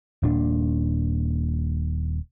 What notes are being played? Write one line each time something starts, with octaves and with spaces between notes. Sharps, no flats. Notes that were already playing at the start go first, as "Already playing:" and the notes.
D#1 A#2 D4